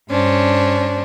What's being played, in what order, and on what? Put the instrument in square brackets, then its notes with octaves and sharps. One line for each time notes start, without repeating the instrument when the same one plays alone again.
[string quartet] G2 C#4 D4 C5